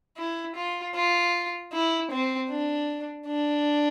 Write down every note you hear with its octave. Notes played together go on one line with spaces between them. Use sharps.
E4
F4
F4
E4
C4
D4
D4